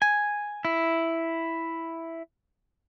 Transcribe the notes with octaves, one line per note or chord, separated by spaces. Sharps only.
G#5
E4